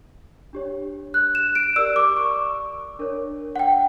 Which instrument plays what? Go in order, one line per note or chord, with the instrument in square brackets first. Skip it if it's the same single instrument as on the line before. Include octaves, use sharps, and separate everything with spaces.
[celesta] D4 G4 C#5
F#6
E7
D7
G4 A#4 D5 E6
D6
C#6
D4 A#4 C#5
F#5
G5